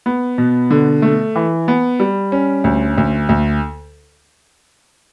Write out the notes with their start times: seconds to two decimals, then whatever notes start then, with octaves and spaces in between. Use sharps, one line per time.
0.06 B3
0.38 B2
0.70 D3
1.02 A3
1.36 E3
1.68 B3
2.00 G3
2.32 C#4
2.64 D2
2.98 D2
3.29 D2